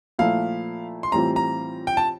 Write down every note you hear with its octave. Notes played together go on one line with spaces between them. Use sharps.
A#2 F3 A3 E4 A4 F5
C6
A2 E3 G3 C4 F4 A#5
A#5
G5
A5